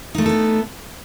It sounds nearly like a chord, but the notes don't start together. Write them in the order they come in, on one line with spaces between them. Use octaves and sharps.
D#4 A3 E4 A4 B3